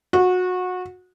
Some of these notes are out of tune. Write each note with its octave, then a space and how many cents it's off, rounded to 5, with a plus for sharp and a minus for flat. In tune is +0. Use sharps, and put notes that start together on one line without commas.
F#4 -25